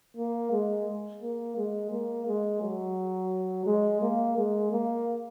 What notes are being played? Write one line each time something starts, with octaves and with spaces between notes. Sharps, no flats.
A#3
G#3
A#3
G#3
A#3
G#3
F#3
G#3
A#3
G#3
A#3